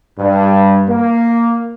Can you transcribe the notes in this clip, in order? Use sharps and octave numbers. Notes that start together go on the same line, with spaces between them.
G2
A#3